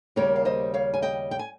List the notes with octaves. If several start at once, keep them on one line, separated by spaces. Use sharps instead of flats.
D#2 C#3 G3 A#3 A#4 C#5
F5
C5 D#5
C#5 F5
G#5
D#5 G5
G5
G#5